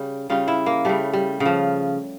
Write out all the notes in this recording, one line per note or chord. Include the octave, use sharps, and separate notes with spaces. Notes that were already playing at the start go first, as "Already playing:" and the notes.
Already playing: C#3 G3
C#3 G3 F4
E4
A#3
C#3 G3 A3
G3
C#3
F3